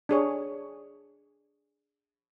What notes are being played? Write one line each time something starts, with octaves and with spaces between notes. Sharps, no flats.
D4 G#4 C#5